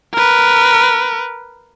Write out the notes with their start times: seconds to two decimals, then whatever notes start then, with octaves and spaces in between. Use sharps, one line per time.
0.14 A#4 B4